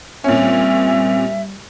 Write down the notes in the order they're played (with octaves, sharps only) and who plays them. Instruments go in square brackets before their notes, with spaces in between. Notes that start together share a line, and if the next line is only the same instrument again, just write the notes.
[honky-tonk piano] A#2 C#4 [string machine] G3 [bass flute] C4 [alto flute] E5